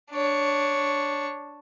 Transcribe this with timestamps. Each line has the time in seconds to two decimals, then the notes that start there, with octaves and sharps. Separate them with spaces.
0.11 D4 C#5